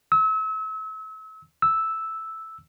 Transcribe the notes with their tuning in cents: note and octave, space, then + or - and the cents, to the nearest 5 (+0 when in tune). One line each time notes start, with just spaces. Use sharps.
E6 -35
E6 -5